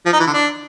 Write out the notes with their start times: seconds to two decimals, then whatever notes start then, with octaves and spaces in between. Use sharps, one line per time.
0.06 F3
0.13 D#4
0.20 E3
0.27 D3
0.34 D4